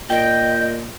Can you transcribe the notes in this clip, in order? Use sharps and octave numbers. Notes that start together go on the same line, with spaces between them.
A#2 D#5 G5